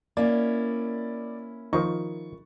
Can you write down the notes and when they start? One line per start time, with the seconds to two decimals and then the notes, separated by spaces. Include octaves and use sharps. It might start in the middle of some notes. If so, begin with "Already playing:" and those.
0.17 A#3 C#4 E4 D5
1.73 D#3 F3 D#4 C#6